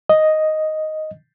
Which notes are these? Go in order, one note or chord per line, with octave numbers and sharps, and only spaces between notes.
D#5